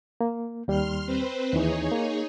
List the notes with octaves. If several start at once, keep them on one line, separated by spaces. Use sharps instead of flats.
A#3
D#2 G3 C6 F6
C4 B4 C5
D#2 E3 D#4 G#4 C#5
A#3